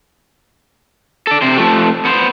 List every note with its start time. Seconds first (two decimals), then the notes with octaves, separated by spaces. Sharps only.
1.27 A4 D5
1.42 C3 C5
1.58 F3 A3
2.05 B3 C5